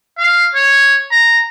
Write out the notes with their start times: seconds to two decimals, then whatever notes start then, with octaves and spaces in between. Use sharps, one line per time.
0.18 F5
0.55 C#5
1.12 A#5